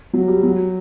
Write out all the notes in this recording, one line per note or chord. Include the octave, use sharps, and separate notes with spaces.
F#3
G3
F#3